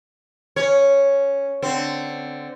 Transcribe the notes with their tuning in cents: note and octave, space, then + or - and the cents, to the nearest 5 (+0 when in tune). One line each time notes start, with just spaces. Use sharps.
C#4 +0 C#5 +0
D3 +0 C4 -15